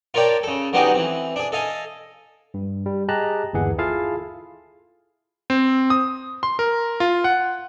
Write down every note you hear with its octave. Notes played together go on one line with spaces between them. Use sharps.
F4 A#4 C#5 D5 G5 A5
C#3 A4
D3 F#3 B3 D#4 G4 G#4
E3 C4
D4 G#4
A4 D#5 F5 G#5
G2
G3
G4 G#4 D#5 A5 A#5 F#6
G1 D#2 E3 G#4 F#5
E4 F4 G#4 A4 F5 A5
C4
D#6
C6
A#4
F4
F#5